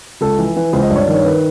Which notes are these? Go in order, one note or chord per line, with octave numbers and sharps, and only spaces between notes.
C#2 A4
E3
E3 B4
C#2 C5
D#5
G2 D5
C#5
D5
D#3
C#5
D#3 B4